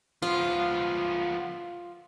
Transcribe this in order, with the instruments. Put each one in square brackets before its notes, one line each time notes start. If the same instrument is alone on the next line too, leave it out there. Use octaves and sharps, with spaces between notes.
[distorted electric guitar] F3 B3 [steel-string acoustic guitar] F4